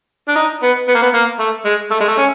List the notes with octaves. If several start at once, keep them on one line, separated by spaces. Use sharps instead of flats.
D4
D#4
B3
B3
A#3
B3
A#3
A3
G#3
A3
G#3
A3
C#4